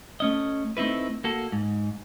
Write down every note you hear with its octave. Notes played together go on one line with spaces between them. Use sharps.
A3 C#4 D#5
A3 C4 D#4 E4 B4
A#3 F#4 A4
G#2